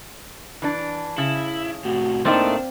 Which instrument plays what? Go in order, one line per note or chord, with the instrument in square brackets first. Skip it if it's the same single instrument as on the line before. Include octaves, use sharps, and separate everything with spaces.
[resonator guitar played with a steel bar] E3 D4
[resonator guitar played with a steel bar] C#3 [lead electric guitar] E4
[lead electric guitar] A2 C3 [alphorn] F#4
[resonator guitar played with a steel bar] A2 A3 D#4 [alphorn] A#3 [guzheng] C4 F4 D5 [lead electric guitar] D4